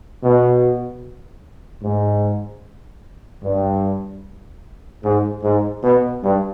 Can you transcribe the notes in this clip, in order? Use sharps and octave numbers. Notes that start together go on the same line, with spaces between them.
B2
G#2
G2
G#2
G#2
B2
G2